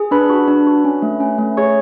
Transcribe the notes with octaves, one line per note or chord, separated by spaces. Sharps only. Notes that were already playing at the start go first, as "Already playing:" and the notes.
Already playing: G#4
D4 B4 B5
F#4
D4
F#4
C#4
A3
C#4
A3
G#4 C#5 C#6